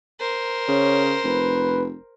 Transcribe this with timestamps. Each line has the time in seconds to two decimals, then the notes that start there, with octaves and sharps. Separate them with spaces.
0.20 A#4 C5
0.68 C#3 C#5
1.24 F1 B4